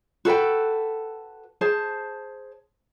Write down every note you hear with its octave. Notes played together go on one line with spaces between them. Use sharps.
F#4 A4 B4 G5
G#4 C5 A5